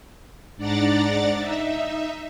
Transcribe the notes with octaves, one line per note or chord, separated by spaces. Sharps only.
G#2 D4 D5 F#5 A#5 A6
D#4 E5